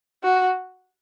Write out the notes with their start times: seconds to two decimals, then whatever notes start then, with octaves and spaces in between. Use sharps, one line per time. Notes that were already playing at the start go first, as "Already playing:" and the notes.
0.24 F#4